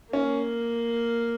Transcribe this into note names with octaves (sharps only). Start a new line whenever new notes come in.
A#3 C#4